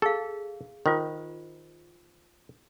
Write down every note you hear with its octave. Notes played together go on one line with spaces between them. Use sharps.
G#4 A4 F5
D#3 F4 C5